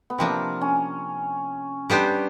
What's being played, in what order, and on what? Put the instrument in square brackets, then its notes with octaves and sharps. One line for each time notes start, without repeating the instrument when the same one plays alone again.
[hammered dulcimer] B3
[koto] C3 F3 A#3 D4 [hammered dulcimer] C4
[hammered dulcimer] C#4
[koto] G3 B3 D4 G4 C5